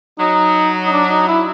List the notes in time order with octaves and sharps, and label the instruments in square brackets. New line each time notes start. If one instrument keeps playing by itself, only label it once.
[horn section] F#3 [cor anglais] D#4
[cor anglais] D#4
D4
D#4
E4